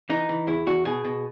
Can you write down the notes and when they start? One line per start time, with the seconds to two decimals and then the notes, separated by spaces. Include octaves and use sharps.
0.10 E3 D#4
0.29 E3
0.47 E2 E4
0.66 E2 F#4
0.85 B2 G#4
1.04 B2